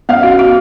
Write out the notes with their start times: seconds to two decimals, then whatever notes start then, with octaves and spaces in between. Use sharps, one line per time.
0.09 B3 F5
0.23 F#4
0.39 F#4